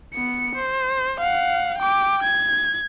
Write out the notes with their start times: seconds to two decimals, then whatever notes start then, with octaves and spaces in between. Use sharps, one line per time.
0.14 B3 C#7
0.55 C5
1.20 F5 F#5
1.79 G5 D6
2.23 G#6